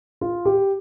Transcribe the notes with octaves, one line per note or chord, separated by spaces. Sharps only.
F4
G4